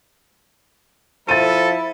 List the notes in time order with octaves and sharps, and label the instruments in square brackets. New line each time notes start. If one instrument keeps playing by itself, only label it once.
[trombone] F3 [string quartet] E4 [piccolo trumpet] A4 [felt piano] A6 D#7